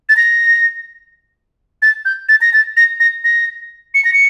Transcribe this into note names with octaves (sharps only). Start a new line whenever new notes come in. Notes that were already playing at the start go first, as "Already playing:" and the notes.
A6
A#6
A6
G6
A6
A#6
A6
A#6
A#6
A#6
C#7
A#6
C#7